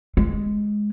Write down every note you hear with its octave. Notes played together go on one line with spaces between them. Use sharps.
G#3